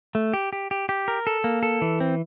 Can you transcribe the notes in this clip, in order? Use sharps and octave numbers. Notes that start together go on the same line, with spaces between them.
A3
G4
G4
G4
G4
A#4
A4
A#3
A4
E3
C4